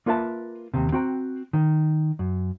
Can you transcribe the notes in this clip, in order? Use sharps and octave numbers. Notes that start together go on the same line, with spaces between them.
A#3 F4 A#4 B4 E5 A5
D#2 C3
C4 F#4 G5 A#5
D#3
F#2